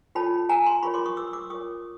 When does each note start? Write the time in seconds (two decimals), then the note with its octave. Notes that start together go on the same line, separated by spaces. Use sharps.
0.15 F4 A4 C#5 A5 B5
0.49 G#5 A#5
0.66 A#5 C6
0.82 F4 A#4 C#5 B5 C#6
0.94 C6 D6
1.06 C#6 D#6
1.17 D6 E6
1.33 D6 E6
1.50 F4 A#4 C#5 C#6 D#6